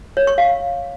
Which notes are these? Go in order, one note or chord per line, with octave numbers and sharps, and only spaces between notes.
C#5
C#6
F5